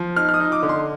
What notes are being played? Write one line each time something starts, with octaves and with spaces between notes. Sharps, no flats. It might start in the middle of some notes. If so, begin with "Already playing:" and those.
Already playing: F3
D#4 F6
F6
D#6
D#4
D6
D3
C6